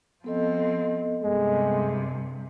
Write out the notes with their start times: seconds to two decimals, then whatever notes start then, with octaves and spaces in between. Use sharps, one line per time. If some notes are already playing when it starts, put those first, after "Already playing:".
0.24 F3 B3 C4 A4 D#5
1.23 G2 C3 G#3